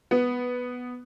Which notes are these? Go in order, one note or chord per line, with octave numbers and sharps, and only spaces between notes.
B3